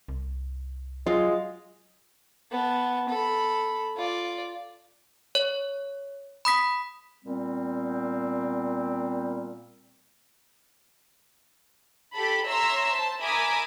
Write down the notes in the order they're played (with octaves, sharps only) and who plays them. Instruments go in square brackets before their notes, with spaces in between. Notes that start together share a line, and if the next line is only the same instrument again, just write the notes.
[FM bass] C2
[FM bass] F#3 [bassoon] G#3 [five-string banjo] F4
[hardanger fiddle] B3 A5
A4 B5
F4 D5
[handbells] C#5
B5 D#6 B6
[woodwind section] A#2 G3 B3 C4
[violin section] G4 A4 B5
C#5 E5 A#5 C6 E6
C5 A5
A#4 E5 G#5 B5 D6 D#6